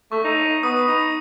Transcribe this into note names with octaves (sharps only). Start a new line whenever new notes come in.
A3 C#6
D#4
B3 D#6
D#4